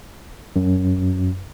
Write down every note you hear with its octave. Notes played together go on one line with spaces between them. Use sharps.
F#2